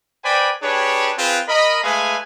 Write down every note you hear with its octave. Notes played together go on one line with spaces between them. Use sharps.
B4 C5 D5 G5 G#5 B5
D4 G4 G#4 B4 C#5
C4 F4 G#4 B4
A#4 D#5 B5
G#3 A3 G#4 B4 F5 G#5